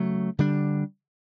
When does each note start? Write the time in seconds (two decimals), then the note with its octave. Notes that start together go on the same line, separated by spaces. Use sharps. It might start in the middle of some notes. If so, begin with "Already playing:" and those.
Already playing: C#3 F#3 A3
0.39 D3 G3 D4